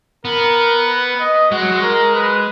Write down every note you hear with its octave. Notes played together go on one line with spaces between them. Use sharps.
B3 A#4
B4
D#5
G#3 F#4
F#3
G#3
A#4
B4